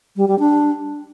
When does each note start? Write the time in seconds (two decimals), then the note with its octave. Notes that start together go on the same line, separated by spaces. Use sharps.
0.16 G3
0.28 G3
0.39 D4